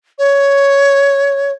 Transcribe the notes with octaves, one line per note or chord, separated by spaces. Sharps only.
C#5